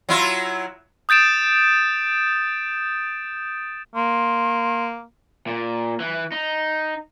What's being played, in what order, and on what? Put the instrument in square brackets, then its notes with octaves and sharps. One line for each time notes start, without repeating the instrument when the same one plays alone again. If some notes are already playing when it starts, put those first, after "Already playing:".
[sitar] F#3 E4 F4
[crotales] D#6 G6 A6 D7 E7
[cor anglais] A#3 [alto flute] C6
[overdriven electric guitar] A#2
E3
D#4